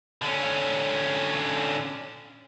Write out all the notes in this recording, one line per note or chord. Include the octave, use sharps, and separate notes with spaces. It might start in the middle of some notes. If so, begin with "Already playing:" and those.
D3 C#4